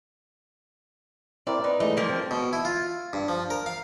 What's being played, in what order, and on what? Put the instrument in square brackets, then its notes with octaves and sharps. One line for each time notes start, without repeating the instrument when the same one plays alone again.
[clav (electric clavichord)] C4 E4 A#4 [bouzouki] D5
[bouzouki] D#4 [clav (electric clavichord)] B4
[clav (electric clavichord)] E3 G#3 A3 [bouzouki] D#4
[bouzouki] F3 A#3
[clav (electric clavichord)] C4
[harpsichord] B2
E4
F4
G2
F3
A#4
F5